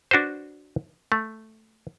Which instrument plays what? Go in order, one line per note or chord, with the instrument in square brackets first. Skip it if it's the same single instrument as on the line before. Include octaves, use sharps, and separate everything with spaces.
[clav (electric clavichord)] D4 F#4 B4 C5
A3